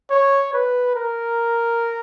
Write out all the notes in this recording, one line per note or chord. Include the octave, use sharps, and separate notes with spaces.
C#5
B4
A#4